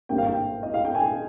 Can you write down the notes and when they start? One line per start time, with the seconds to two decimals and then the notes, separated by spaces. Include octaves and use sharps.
0.09 G#1 G2 G3 A#3 G5
0.18 F5
0.26 G5
0.63 D#5
0.74 F5
0.85 G5
0.95 G#5